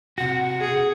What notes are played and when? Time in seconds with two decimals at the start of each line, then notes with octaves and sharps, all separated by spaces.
0.18 C3 F#4 F#5
0.61 G#4